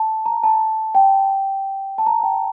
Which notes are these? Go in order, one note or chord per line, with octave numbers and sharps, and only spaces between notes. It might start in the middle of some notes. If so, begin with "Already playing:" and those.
Already playing: A5
A#5
A5
G5
A5
A#5
G5